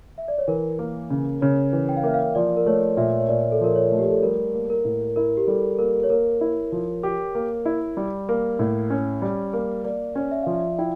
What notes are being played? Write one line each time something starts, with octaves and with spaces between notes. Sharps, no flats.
E5
D5
C#5
E3 A#4
A#3
C#3
C#3 C#5
E3
G5
F5
A#3 E5
F5
F3 D5
A#4
A3 C#5
A#2 E5
C#5
A#2 D5
A4
F3 A#4
C#5
A3
G4
A4
G3 A#4
A#3
A#4
A2
E4 A#4
G4
G3 A4
A#3 A#4
C#5
A#3 A#4
E4
F3
G4
A#3
E4
G3
A#3
A2
C#4
G3
A#3
A#3 D5
C#4
E5
F3 F5
E5
E4 G5